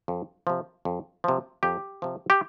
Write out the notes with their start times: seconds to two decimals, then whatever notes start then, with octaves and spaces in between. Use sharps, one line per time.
0.08 F2
0.47 C3 F3
0.85 F2
1.24 C3 F3
1.63 F2 G4
2.02 C3 F3
2.30 G4